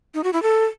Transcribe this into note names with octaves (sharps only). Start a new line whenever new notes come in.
D#4
F#4
E4
A4